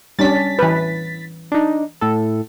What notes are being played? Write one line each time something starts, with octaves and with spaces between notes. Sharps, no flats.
G3 C#4 D4 A6 B6
E3 B4
D4 D#4
A2 A4